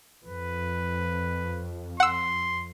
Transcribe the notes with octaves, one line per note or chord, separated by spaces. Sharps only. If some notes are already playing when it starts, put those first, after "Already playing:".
F2 B4
F#5 C6 E6